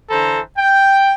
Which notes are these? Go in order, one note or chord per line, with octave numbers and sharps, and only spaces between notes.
D3 E3 A4 C5 A#5
G5